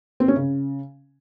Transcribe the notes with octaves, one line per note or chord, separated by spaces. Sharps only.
C4
C#4
C#3